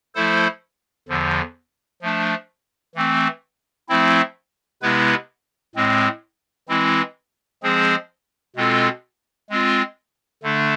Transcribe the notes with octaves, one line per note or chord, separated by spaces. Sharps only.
F3 A3 E4 A4 C5
E2 D3 F3
F3 A3 D4
E3 A3 C4
F3 A3 C4 E4
C3 G#3 B3 E4 B4
A2 G#3 C4
E3 G#3 C4 E4
F3 G#3 C4 G#4 C5
B2 G#3 C4 F4 A4
G#3 C4 F4
D3 A3 D4